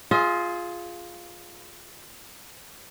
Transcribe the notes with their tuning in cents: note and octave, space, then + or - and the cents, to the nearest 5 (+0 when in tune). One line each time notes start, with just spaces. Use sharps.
F4 +0 G#4 +0 D#5 +45